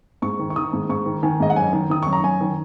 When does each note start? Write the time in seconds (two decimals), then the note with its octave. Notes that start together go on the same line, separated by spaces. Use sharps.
0.22 G#2 C#6
0.39 D#3
0.50 C#6
0.56 D#3 D#6
0.73 G#2
0.89 G#2 C#6
1.06 D#3
1.23 D#3 G#5
1.40 G#2 D#5
1.50 F#5
1.56 F#2 G#5
1.73 D#3
1.90 D#3 D#6
2.03 F#2 C#6
2.13 A#5
2.24 F#2 G#5
2.41 D#3